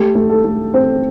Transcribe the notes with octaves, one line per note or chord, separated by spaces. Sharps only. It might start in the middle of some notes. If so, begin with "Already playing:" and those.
Already playing: A3 G4
A3
A4
A3
C4 C5